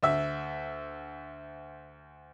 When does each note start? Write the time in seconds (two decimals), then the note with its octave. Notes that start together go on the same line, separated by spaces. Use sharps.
0.03 D2 E5